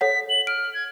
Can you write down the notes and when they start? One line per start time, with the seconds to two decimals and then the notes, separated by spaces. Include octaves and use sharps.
0.01 A4 C#5 F#5 B6
0.29 F#7
0.47 F6 D7
0.74 G#6